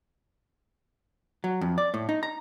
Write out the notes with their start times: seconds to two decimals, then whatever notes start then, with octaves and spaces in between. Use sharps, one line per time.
1.44 F#3
1.61 F2
1.78 D5
1.94 A2
2.09 D#4
2.23 A#5